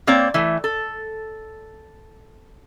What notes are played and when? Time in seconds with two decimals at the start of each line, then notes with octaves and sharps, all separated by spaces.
0.07 A#3 C4 C#5 D5
0.34 E3 A3
0.64 A4